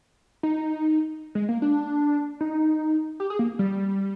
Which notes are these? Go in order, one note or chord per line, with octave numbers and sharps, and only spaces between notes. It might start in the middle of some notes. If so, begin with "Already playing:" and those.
D#4
G#3
A#3
D4
D#4
G4
G#4
A#3
G3